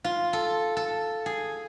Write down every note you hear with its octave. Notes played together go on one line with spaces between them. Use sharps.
F4
A4
A4
G#4